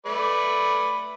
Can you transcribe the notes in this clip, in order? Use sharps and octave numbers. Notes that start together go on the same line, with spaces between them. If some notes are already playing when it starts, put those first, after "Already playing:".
A3 B4 D5